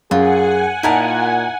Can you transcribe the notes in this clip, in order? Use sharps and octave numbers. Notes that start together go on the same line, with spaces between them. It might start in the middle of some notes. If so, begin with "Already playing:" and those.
F#2 F4 G#4 F#5 G#5
A#2 D#4 E4 A#4 A5